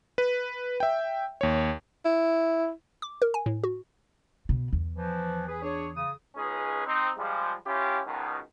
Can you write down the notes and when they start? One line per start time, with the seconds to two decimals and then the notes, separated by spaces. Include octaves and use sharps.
0.18 B4
0.80 E5 G5
1.41 D#2 C#5
2.05 E4
3.02 D6
3.22 A#4
3.34 G#5
3.46 A2
3.64 F#4
4.49 B2
4.73 E2
4.95 E3 F3
5.47 G#4 B4
5.62 D4 G#4 C#5
5.95 C#3 D#6
6.36 C#2 G#3 C#4 D#4 G#4 B4
6.86 C4 D#4
7.17 F3 G3 G#3
7.66 C#4 E4 F4 G4
8.05 C#2 B2 D#3